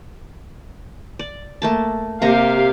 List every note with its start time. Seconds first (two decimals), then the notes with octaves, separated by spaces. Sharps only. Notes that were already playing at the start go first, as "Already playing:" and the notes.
1.19 D5
1.62 A3 A#3 A5
2.22 C3 A#3 G4 F5 A#5